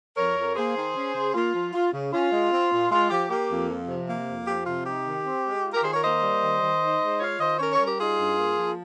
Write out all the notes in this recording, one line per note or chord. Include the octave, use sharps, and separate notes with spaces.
F2 A#4 C#5
F2
A#3 G#4 C5
D#3
C#4
C#3
A#3 F4
F3
F4
C#3
C#4 F4
G#3
C4
A#2
G#3 F4
F3 G4
A#3 G4
F2
F3
C3
A#3
F2
F3 G4
C3 F4
D#4 G4
D#3
C4
G#3
F4
G4 A#4
D#3 G#4 C5
A#4 C#5
A#3 C5 D#5
G3
D#3
D#3
D#4
G#3
F4 C#5 F5
D#3 C5 D#5
C#4 A#4 C#5
A#4 C#5
G3
G4 A#4
D#4 F4 G#4
G2
A#3
F3